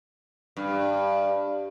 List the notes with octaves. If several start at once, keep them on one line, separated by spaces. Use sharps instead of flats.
G2